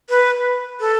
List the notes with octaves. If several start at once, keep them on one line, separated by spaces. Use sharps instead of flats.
B4
A4